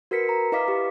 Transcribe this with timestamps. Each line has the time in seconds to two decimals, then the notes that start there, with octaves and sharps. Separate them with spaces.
0.11 F#4 A#4 B4 B6 C#7
0.29 A#5
0.52 E4 B4 D#5 F5 D6 B6
0.68 G4